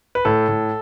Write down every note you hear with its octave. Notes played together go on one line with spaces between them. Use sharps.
B4
A2 A4
A2